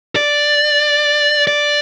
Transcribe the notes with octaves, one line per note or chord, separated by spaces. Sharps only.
D5
D5